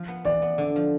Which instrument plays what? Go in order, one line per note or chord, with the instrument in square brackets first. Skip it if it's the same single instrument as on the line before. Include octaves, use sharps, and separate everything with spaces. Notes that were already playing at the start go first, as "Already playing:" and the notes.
Already playing: [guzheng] F3
B3
[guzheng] E3 [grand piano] D5
[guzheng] B3
D3
F3